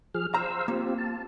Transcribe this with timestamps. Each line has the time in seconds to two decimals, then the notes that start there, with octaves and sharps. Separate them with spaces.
0.14 F3 G#4 F6
0.34 C5 F5 A#5 E6
0.68 A#3 C4 F4 G4
0.98 A5